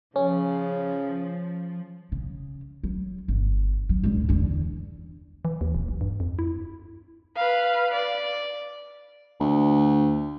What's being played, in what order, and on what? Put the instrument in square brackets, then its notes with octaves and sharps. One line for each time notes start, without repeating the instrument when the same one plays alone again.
[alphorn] C#3 [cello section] F3 [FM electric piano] C#4
[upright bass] C#3
F#3
G1
F#3
C#2 G2
E2 D3
[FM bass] E3
D#2
D1
B1
G2
F2
E4
[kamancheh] B4 F5
D5
[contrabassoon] D2